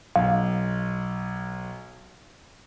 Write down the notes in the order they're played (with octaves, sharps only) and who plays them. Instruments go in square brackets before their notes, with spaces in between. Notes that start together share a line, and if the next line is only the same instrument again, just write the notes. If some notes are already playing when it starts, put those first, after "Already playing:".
[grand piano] B1 [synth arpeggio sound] F5